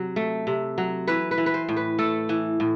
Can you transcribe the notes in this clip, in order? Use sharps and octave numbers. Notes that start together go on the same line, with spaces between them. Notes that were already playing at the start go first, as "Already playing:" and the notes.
Already playing: C3 F#3
A3
C3
F#3
E3 B4
B4
E3
B4
C5
A2
B4
A3 A4
E3
A2